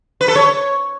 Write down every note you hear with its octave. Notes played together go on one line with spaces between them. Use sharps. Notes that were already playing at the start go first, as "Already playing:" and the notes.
B4
A4
C#5